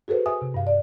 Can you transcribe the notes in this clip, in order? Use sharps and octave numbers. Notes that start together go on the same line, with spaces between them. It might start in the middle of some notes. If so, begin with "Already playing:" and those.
F#4 G#4 A4 B4 C5
E5 G#5 D#6
C3
G2 F5
D5